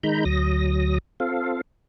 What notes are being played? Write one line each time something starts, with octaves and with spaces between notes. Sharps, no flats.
D#3 G#3 D#4 A#5 B5 G6
D2 F#3 D#6 A#6
C4 F4 A4 F5